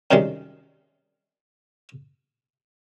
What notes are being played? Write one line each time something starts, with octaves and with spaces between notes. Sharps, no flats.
F#2 C3 D#3 G3 G#3